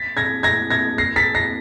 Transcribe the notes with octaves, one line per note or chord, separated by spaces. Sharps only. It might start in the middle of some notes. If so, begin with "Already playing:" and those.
Already playing: A6 B6
G#6 A#6
G#6 A#6
G#6 A#6
A#6 C7
A6 B6
A#6 C7